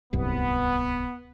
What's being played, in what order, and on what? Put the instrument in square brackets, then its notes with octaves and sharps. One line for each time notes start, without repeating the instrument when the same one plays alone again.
[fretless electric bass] D1 C2 G2 [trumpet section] B3